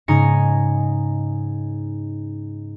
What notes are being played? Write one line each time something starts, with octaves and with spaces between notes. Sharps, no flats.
G#2 C#3 D#4 G#5 A#5 C#7